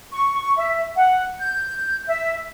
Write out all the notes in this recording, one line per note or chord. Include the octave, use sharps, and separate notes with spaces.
C#6
E5
F#5
G6
E5